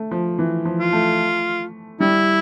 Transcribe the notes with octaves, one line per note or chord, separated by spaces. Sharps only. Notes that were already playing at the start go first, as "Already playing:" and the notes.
Already playing: A3
F3
E3
F3
F4
A3
G3 E4